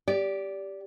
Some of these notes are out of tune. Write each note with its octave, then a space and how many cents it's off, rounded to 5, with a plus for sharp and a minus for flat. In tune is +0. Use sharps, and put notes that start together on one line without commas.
G4 +0 D5 -20